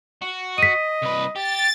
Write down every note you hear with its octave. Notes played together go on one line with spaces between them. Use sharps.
F#4
D#5 B6 D#7
C2 B4
G4 A6